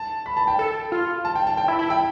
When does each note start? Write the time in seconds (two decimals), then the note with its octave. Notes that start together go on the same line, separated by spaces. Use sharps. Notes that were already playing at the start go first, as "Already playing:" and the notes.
Already playing: A5
0.26 B5
0.37 A5
0.48 G5
0.59 A4
0.92 F4
1.25 A5
1.35 G5
1.47 A5
1.57 G5
1.68 E4
1.79 E4
1.90 G5